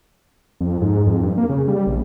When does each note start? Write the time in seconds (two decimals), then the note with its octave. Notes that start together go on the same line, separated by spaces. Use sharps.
0.61 F2
0.81 G#2
1.06 F2
1.23 G2
1.37 A#3
1.49 C#3
1.68 G3
1.87 A#1